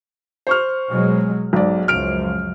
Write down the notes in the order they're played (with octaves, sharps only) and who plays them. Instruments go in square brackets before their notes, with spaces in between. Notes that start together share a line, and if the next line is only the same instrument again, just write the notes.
[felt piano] C5 C#6 F6
[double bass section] B2 F#3 G#3
[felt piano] B1 D5 [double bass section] G#2
[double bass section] C#2 F#2 F3 [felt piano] F6 D7